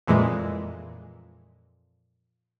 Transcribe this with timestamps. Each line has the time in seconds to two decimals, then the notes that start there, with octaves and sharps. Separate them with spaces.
0.07 F2 A#2 E3 G#3